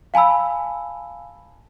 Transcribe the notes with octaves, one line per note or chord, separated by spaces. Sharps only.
F5 G#5 A5 B5 E6